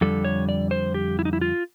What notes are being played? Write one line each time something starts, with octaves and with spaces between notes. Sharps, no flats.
F2 D3 G3 A4
C#5
D5
C5
G4
E4
D#4
E4
F4